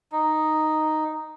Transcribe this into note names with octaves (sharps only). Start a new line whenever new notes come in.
D#4